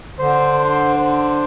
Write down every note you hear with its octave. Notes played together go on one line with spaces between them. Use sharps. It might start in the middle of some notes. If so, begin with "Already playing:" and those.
D3 C5
C5